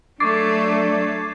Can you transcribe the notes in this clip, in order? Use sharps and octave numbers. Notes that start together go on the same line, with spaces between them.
F#3 A3 D4 C#6 D6 G#6 A6 C7